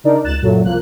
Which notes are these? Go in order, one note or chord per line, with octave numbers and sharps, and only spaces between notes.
C#3 D4 D#4 A#4 D5
C#2 F#6 A6 E7
F#2 A#2 F#3 A3
C2 F3 A#3 F#6